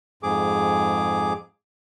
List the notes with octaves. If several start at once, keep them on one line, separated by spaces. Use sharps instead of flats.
F2 G#2 G#4 D6